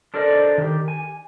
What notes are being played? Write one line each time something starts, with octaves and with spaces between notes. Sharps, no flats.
D4 A4 A#4 C5 D5 D#5
D#3 G4
G#5